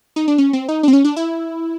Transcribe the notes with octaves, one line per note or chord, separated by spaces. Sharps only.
D#4
D4
C#4
C4
D#4
D4
C4
C#4
D4
E4